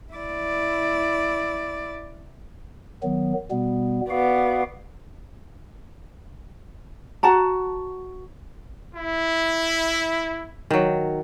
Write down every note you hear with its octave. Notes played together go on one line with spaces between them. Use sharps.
E4 D5
D#3 F#3 B3
B2 G3 B3
B3 F#4 D5 F5
F#4 F#5 A5 A#5
E4
D#3 F#3